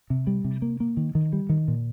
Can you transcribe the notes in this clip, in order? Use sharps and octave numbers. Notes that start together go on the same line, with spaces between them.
C3
G3
C3
A#3
A#3
D#3
D#3
G3
D#3
A#2